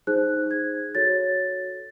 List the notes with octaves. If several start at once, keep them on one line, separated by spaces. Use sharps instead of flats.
D#4 G#4 C5 F#6
G#6
F#4 A4 C#5 A6